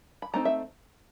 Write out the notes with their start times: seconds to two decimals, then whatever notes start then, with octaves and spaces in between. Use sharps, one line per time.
0.22 B5
0.34 A3 C4 D#4 A#5
0.45 E5